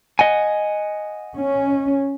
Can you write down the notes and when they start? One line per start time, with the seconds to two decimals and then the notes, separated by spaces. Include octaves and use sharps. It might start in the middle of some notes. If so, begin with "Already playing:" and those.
0.19 D#5 F#5 G#5
1.35 C#4